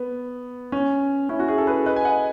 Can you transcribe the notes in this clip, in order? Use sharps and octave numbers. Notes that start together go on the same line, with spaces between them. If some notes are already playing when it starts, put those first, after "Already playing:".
Already playing: B3
C#4
C#4 E4
F#4
E4 G#4
A4
G#4 B4
B4 D#5
G#5
D#5 F#5